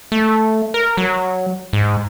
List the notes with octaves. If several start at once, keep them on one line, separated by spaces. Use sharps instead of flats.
A3
A#4
F#3
G#2